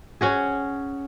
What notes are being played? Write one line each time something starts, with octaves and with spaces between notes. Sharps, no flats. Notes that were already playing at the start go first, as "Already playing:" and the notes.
C#4 F#4 G#4